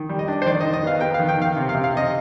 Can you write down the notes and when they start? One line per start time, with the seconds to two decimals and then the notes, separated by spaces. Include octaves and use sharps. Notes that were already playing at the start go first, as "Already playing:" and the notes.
Already playing: D#3
0.09 G3
0.19 D#5
0.28 D4
0.42 C5
0.46 D#3 D5
0.61 D#5
0.65 D#3
0.74 D#5
0.83 B3 F5
1.01 B3 G5
1.14 F5
1.19 D#3
1.29 G5
1.38 D#3 F5
1.56 C3
1.69 F5
1.75 C3
1.84 F5
1.93 C3 D#5